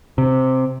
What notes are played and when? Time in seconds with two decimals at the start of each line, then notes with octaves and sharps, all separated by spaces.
0.18 C3